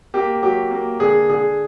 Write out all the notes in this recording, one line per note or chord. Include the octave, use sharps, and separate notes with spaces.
A#3 G4
F#3 G4
A#3
D3 G#4
D3 G#4